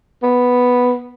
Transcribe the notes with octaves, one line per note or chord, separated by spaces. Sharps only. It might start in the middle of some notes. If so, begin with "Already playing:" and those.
B3